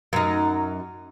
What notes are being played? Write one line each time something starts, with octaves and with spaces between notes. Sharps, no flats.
F#2 D#4